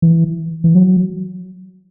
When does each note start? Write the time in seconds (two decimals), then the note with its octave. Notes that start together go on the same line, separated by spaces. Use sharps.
0.02 E3
0.64 E3
0.75 F#3